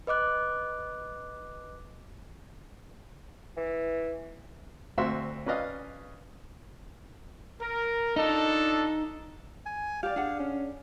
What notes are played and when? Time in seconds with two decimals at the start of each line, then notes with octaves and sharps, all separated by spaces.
0.07 B4 D#5 D6 F#6
3.57 E3
4.98 D2 C4 F#4 E5 C6 E6
5.46 C#4 B4 D5 D#5 F5
7.60 A#4
8.16 D4 D#4 F4 A4
9.66 G#5
10.03 G4 D5 F5
10.16 D4 G#4 F#5
10.39 C#4